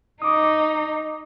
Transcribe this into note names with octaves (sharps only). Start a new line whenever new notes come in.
D#4 D6 D#6